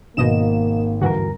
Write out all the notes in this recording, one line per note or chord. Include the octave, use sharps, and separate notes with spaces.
G#1 B2 A#3 D#5 E7
D2 G2 E3 F#4 A#4